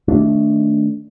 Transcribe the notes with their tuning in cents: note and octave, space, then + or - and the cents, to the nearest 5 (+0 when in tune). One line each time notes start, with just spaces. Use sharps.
D#3 -20 A3 +0 D4 -15